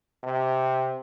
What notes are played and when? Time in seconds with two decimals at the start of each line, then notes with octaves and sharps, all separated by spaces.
0.24 C3